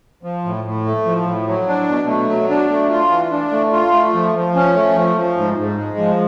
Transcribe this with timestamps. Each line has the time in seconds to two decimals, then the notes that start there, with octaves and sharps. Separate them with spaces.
0.23 F3
0.45 A2
0.65 A2
0.85 A3
1.05 F3
1.26 A2
1.47 F#3
1.67 D4
1.88 B2
2.08 A3
2.29 F#3
2.50 D4
2.70 A3
2.90 F4
3.10 E3
3.32 D4
3.52 A3
3.72 F4
3.93 A3
4.14 F3
4.34 F3
4.55 C#4
4.75 A3
4.96 F3
5.16 F3
5.37 G#2
5.57 G#2
5.78 G#3
5.98 F3